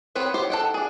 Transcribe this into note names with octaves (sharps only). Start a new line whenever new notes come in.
B3 C4 B4 C#5
G4 C5 C#5
A4 F#5 G5
D4 G#4